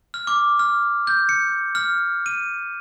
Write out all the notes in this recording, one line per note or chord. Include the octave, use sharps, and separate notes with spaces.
F6
D6
F6
G6
C#7
F6
D#7